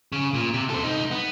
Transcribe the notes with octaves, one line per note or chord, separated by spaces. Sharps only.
C#3
A#2
C3
A4 C5
C2 D#4
B3